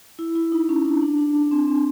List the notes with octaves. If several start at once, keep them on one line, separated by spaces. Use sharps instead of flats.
E4
E4
D#4
C#4
D4
D4
D4
D4
C4
C4